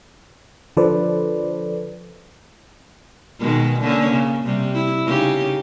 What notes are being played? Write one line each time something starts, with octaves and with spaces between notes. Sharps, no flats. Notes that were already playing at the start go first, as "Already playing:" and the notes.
D3 F3 A4 B4 C5 D5
B2 D#3 G#3
D3 A#3 C#4
C#3
C3 G3
E4
C#3 D#4 G4